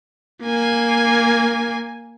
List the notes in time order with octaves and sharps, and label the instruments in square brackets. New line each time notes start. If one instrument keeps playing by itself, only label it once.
[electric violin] A#3 G#5